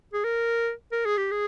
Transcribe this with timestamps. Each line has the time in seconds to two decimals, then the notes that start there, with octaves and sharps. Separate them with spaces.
0.13 G#4
0.24 A#4
0.92 A#4
1.05 G#4
1.17 G4
1.31 G#4